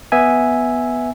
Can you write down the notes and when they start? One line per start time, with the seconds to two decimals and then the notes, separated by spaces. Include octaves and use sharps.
0.12 B3 E5 G#5